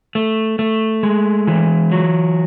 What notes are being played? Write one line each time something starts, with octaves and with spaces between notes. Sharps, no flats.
A3
A3
G#3
E3
F#3